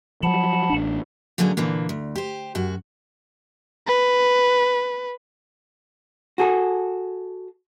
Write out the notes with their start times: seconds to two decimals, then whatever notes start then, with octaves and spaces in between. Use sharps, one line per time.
0.23 F3 F#3 F#5 A5 B5
0.70 A1 D4
1.38 A2 D3 F#3 A#3 C#4 G#4
1.57 A#2 D3 E3 A#3
1.89 D2
2.15 G4 C5
2.55 F#2 F#4
3.87 B4
6.38 F#4 G#4 A4